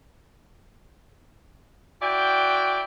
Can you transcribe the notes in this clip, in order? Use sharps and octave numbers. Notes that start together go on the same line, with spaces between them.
E4 F#4 D5 G5